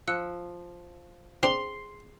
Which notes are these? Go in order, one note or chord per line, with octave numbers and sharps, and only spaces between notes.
F3 E6 F#6 C#7
C4 D4 G#4 C6